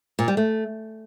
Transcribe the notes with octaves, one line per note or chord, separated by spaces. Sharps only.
A#2
G3
A3